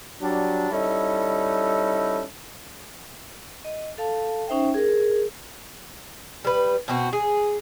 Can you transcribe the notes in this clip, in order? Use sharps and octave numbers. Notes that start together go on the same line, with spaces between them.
F#3 G3 D4
G3 C#4 D#4 E4 A4
D#5
A4 F5 A5
C#4 D#4 C5 E5 G5
G#4 A#4
G3 B4
B2 C4 F#4
G#4